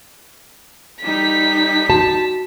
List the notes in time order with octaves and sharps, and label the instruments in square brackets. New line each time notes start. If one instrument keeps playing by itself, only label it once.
[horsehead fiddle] G3 D#4 [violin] B6
[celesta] F#4 [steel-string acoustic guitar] A5